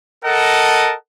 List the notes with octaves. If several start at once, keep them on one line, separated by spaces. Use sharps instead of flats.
A4 A#4 D#5 F#5 A5